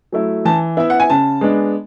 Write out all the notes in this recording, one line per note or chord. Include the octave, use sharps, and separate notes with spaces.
F#3 A3 E4
E3 A5
B3 E4 E5
F#5
G#5
C#3 A5
G#3 B3 D4